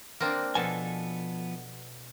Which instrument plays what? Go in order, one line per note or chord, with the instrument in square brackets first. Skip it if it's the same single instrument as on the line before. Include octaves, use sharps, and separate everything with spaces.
[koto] A#3 C4 D4
[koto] B2 A4 [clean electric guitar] F3 B3 G#5